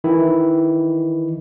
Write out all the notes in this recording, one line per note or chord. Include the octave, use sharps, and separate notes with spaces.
D#3 E3 E4